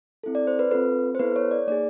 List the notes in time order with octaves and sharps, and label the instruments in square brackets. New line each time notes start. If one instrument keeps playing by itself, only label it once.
[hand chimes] C4 E4 A4
D5
C5
B4
C4 F4 A4 B4
C5
B3 E4 A4 B4
C#5
D5
A#3 D#4 G#4 D5